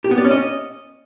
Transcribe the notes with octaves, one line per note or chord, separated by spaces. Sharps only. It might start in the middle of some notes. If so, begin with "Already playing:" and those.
G4
B3
D5
C#4
D#5